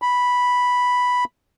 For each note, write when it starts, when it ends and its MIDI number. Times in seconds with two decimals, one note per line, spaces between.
0.02 1.24 83